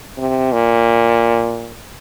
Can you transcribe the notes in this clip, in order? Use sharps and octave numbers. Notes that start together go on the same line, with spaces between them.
C3
A#2